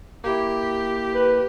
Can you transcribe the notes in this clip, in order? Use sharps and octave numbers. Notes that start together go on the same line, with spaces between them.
A#3 E4 G4
B4